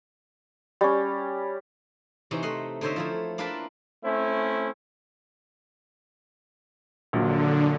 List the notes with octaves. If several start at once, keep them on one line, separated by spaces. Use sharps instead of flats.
G3 C#4
C3 E3 C#4 D#4
A3 D#5 F#5 C6
D3 D#4 C5 C#5 D#5 E5
F3 A3 E4
A#3 D4 F4 B4 E5 A5
A3 C4 C#4 E4
A#1 A#2 D3 F#3